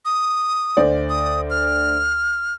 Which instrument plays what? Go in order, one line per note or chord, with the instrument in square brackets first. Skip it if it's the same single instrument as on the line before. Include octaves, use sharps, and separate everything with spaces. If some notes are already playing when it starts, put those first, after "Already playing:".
[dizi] D#6
[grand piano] D2 C5 D5
[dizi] D#6
F6